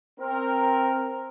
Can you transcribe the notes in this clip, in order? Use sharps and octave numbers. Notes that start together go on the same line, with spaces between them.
C4 A#4